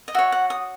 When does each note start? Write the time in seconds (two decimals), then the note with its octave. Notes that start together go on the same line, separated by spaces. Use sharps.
0.08 D#5
0.14 F#4 C#5 E5
0.32 F#5
0.50 D#6